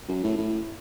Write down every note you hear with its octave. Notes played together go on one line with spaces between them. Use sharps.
F#2
A2
A2